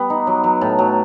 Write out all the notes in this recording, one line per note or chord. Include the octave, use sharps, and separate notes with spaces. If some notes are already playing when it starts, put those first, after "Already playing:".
Already playing: G3 B3
D#4
F#3
F#3
A2
F#3